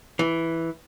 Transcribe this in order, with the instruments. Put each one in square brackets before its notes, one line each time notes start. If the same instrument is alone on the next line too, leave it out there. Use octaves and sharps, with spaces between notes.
[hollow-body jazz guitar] E3